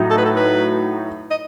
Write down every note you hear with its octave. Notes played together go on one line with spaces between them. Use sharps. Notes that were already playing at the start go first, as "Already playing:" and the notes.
Already playing: A2 F#3 A3 D#4
A4
B4
A4
B4
D#5